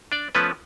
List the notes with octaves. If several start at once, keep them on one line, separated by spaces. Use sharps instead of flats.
D4 D5
F3 A3 B3 C#4 B4